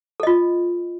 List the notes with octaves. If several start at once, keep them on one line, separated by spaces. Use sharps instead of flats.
F4 A4 D#5